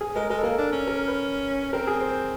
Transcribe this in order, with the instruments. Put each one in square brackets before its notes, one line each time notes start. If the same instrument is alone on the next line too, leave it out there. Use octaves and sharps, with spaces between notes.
[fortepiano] G#4
[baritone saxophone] G#3 [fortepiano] A#4
[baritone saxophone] G#3 [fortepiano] A#4
[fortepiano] A4
[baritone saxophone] A#3 [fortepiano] A#4
[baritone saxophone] D4
C#4
[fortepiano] A#4
B4
[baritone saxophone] C4 [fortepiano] A#4
[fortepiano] G#4
C5